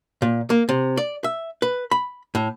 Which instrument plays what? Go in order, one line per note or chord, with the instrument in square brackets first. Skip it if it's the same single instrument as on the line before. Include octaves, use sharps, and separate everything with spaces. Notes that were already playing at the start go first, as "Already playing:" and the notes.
[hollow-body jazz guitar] A#2
A#3
C3
D5
E5
B4
B5
A2